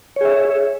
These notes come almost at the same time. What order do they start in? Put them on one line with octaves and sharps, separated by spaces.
C#5 G#4 E5